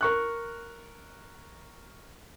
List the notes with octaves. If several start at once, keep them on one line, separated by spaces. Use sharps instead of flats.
A#4 C#6 F#6